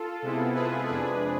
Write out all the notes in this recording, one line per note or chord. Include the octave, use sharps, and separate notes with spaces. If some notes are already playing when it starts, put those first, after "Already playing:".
Already playing: F4 A4
C3 G#3 B3 E4
G#4 B4
F2 C3 G#3 D4 G#4 B4